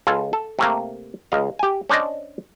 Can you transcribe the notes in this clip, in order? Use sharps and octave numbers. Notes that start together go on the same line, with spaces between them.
C#2 F4 A4 G#5
A4
C3 A3 A#3
C#2 D#5 F5
G4 G#5
C#4 D4 C5 D5 D#5